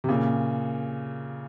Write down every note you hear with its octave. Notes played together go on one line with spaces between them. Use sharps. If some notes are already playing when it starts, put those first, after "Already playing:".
C3
A#2 C#3